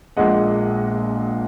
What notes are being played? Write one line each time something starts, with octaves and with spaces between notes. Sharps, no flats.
A#1 A#2 G#3 D#5 F#5